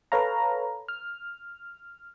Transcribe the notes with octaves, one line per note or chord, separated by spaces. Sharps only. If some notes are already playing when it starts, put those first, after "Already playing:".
A4 B4 C#5 F5 A#5
F6